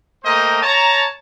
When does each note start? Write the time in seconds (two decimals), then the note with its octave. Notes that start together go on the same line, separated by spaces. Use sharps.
0.24 A3 A#3 C5 D#5 G5 A#5
0.62 C#5 A5 A#5